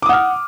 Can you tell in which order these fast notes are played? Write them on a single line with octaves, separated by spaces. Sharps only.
D6 D#6 F#5 F6